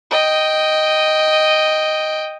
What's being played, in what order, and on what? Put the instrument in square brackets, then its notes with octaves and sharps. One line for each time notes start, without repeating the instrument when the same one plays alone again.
[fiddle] D#5 G5